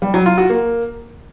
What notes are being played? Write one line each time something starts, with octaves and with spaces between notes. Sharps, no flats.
G3
F#3
F4
F#4
A#3